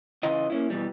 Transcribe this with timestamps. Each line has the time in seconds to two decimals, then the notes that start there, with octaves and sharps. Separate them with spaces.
0.23 C#3 E3 F4 D#5
0.50 A#3 C#4 E4
0.70 B2 E3 G3